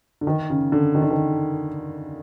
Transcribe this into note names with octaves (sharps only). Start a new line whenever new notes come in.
D3
D#3
C#3
D3
D#3
D3
D#3